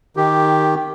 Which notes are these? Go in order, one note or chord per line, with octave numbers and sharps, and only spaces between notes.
D#3 G4